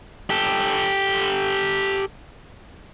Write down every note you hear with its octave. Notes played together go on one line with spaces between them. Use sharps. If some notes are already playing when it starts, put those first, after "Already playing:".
G4 A4